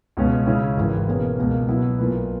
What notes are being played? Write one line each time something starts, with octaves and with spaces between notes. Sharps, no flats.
C#2 B2 G#3 C#4
C#3 G#3 C#4 E4
G#1 G#2 E3
B2 A#3 C#4 G#4 B4
C#2 B2 A#3
B2 F#3 B3 E4
B1 A#2 A#3 E4 B4